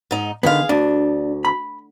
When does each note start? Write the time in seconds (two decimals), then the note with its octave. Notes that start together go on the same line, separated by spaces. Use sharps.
0.11 G#2 D#4
0.43 D3 D#3 B3 G#4 F5
0.69 D2 D4
1.45 B5